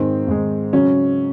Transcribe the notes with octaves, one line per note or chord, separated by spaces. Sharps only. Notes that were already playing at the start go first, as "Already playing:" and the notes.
Already playing: G#2 D#3 G#3 C4
G#2 D#3 G#3 C4
C#3 F#3 C#4